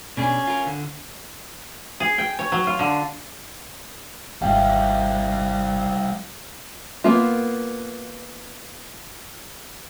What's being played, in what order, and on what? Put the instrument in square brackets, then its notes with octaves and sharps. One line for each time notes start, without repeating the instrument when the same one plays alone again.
[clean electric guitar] B2 D4 G#4 [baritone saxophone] C#4
[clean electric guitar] F4 A#4
D3
[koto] G#4
G5
C#5
F#3
F4
D3
[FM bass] G#1 [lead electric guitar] G3 E4 [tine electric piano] F5 G5
[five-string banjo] A#3 B3 F4